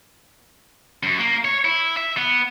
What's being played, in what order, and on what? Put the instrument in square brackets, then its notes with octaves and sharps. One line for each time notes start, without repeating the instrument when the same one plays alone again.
[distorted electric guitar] F#2
A#3
C#5
E4
E5
B3